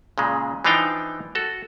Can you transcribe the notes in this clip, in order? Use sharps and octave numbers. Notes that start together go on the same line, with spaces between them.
A#2 C#3 G#3
E3 F3 D4 D#4 F5 G5
F#4 A4